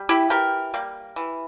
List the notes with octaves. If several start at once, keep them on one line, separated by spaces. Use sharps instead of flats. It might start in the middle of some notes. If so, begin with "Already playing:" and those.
Already playing: G3
E4 G4
E3 G4 A#4
G3 A#3
E3